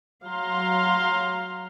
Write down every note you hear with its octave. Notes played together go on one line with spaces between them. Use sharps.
F#3 F5 A#5 C6